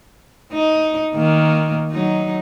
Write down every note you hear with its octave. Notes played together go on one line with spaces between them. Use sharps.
D#4
D#3 A#3
F#3 D#4